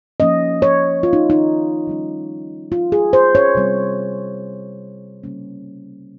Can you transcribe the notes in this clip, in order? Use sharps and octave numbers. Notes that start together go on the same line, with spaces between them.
F3 A#3 C#4 D#5
C#5
F4
D#4
D#4
D#3 G3 C#4
F4
G#4
C5
C#5
C3 G3 C4
C#3 G3 A#3 C#4